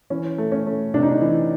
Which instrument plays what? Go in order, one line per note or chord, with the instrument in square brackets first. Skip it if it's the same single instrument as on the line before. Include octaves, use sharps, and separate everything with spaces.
[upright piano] E3 [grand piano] C#4
[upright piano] A3
[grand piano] C#4
[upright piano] A3
[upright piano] C3 [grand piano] D4
[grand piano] D#4
D4
[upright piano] E3